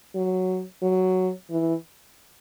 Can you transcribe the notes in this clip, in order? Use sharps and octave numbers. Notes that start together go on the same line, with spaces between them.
F#3
F#3
E3